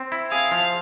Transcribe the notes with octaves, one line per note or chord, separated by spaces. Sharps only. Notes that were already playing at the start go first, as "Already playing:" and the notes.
Already playing: C4
E4
G#4 F5
F3